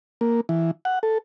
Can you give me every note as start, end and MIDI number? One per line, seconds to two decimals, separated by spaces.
0.21 0.41 58
0.49 0.71 52
0.85 0.99 78
1.03 1.18 69